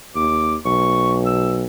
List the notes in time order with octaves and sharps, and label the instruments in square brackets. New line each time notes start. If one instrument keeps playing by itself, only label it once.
[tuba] D#2 [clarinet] D6
[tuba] B1 [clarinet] C#6
[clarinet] E6